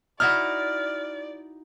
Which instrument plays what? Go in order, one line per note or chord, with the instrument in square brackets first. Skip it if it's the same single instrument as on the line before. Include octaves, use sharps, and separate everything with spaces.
[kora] D#4 E4 F#4 [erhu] D5 [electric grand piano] F6